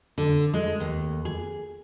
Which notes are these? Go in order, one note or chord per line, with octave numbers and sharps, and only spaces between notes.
D3
G#3
D#2
G#4